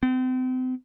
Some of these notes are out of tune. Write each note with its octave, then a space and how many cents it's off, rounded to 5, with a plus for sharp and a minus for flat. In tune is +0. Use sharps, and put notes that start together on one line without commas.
C4 -40